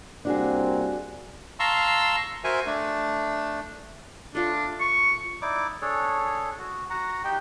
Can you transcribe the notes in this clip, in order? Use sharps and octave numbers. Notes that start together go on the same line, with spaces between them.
C2 A#3 C4 D4 F#4 G#4
F5 A5 A#5 C6 C#6 E6
F#4 A#4 C5 E5 G#5 C#6
A3 D4
A3 D4 F4
C#6
D#4 E4 D5 D6
D4 G#4 A4 C#5
F#4
F#4 F#5 A#5
D#4 G4 G5